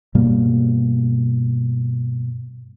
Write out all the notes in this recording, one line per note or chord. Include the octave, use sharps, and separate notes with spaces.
G2 B2 G3 A#3